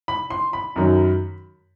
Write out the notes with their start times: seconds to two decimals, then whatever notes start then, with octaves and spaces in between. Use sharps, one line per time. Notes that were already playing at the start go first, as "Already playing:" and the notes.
0.08 B5
0.30 C6
0.53 B5
0.76 F#2 D#3 F#3